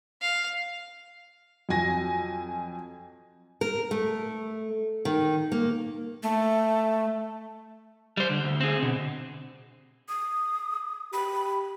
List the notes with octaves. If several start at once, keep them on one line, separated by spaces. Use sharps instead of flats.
F5
F2 F#3 G#5 A#6
A#4
A3
D#3
A#3
A3
G3 C5
D3
D2
C4 G#4
B2 D3
D#6
G4 B5